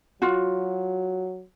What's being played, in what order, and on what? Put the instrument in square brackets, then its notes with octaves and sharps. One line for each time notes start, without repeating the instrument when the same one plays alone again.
[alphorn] F#3 [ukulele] F4 F#4